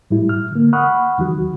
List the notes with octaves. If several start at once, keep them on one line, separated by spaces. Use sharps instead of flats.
A2 G3 E4
F6
D3 A#3
F#5 B5 C#6 D#6 F6 F#6
D#2 D#3 F#3 F#4